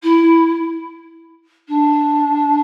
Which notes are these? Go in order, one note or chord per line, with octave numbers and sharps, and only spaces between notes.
E4
D4